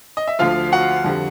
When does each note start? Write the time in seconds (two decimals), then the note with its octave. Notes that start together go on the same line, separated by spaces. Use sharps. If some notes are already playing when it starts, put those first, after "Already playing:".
0.17 D#5
0.28 E5
0.39 D2 D3 F3 F4 F5
0.72 F#4 F#5
1.04 F2 D3 G3